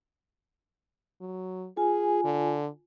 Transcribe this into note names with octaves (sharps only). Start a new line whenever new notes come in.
F#3
F4 G#4 G#5
D3